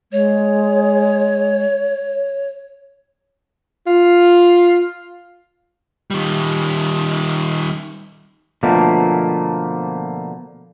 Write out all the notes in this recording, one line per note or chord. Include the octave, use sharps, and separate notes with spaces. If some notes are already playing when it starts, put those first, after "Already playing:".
G#3 C#5
F4
D#3 G3
B2 D3 F3 A3 A#3